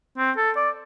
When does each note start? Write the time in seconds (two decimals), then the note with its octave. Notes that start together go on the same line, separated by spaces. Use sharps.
0.18 C4
0.37 A4
0.56 D5